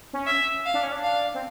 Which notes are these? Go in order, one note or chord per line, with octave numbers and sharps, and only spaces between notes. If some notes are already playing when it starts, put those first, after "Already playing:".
C#4
E5
F5
D4
C#4
D4
F5
C4